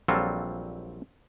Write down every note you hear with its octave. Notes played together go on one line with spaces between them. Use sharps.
A#1 F#3 G3 C4 F4 A4